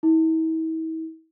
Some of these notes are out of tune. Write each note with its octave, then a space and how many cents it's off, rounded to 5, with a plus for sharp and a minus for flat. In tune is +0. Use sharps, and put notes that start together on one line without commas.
E4 -40